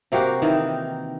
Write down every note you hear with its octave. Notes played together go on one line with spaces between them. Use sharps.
C3 A#3 F#4 G4
D#3 E3 D#4